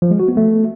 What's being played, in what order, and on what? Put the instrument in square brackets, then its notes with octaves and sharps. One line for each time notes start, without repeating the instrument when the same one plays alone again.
[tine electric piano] F3
G#3
F#4
B3
A3